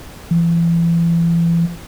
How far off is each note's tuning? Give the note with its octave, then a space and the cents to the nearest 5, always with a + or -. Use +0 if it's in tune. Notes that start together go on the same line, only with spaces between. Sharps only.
E3 +35